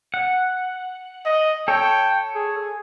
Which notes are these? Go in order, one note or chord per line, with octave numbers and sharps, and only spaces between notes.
F#5
D#5
A4 C#5 G5
G#4